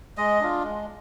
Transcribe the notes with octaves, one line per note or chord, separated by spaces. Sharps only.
G#3 D#5
D4 F4
G#3